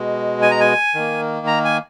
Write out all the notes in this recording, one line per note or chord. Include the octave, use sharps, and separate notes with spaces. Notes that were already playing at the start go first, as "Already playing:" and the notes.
Already playing: B2 G#3
G#5
A#5
G#5
D#3 A#3
A#5
G#5